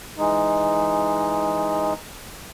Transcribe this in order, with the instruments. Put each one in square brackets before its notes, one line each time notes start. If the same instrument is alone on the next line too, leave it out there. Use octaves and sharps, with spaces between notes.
[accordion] E3 G#3 D#4